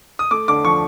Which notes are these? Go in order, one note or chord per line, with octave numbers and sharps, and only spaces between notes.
D#6
A3 D6
D3 D6
F3 C#6